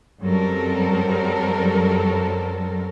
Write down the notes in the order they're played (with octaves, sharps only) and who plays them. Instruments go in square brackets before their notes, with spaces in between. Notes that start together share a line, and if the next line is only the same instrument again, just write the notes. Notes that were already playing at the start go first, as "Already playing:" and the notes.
[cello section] F#2 F#3 G3 C4 A4 A#4